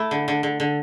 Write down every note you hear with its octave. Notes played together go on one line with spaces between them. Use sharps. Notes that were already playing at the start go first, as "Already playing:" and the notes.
Already playing: A3 E4
D3
D3
D3
D3